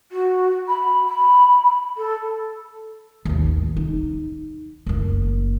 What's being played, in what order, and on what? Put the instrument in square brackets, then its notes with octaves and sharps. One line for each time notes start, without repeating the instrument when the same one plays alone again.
[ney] F#4
B5
B5
A4
[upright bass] A1 D#2
D#4
F#1 A#3